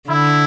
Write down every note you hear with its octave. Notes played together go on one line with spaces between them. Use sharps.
D3 E4